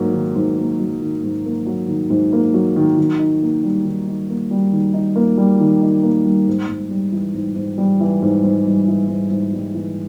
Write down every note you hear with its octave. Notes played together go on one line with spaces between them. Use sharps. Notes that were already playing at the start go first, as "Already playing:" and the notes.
Already playing: G#2 F#3 A#3
D#3
G#2
A#3
F#3
D#3
G#2
A#3
F#3
D#3
G#2
A#3
F#3
D#3
D#3
D#4
A#3
G3
D#3
D#4
A#3
G3
D#3
D#4
A#3
G3
D#3
D#4
A#3
G3
G#2
G#2
G3
E3
G#2
G#2
G3
E3
G#2
G#2
G3
E3
G#2
G#2
G3
E3